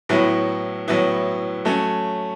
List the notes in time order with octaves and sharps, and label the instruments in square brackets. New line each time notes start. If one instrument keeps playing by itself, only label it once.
[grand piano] A2 F#3 B3 E4
A2 F#3 B3 E4
F#3 A3 C#4